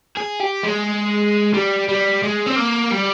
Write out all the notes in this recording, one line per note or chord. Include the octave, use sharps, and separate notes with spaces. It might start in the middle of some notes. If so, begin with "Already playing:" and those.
G#4
G4
G#3
G3
G3
G#3
C4
A#3
G3